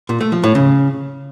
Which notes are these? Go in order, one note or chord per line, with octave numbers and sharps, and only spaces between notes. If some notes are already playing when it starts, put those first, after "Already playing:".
A#2
A3
F3
A2
C#3